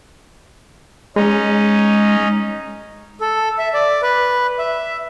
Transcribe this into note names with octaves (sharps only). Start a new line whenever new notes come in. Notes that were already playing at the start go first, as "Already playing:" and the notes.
G#3 C#4 D#4
A4
E5
D5
B4
E5